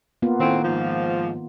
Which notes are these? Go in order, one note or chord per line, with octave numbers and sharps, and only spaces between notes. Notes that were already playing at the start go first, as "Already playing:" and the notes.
A#3 B3 F4
A2 D#3 C4
G#2 F3